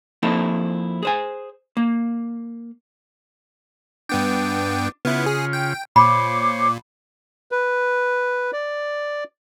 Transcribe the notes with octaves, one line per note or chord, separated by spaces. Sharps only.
F3 A#3 C4 D#4 E4 A4
G#4 C5 G#5
A#3
G2 B3 D4 G5
C#3 B3 E4 F4
G#4
G5
A#2 C5 C#5 B5 D6
B4
D5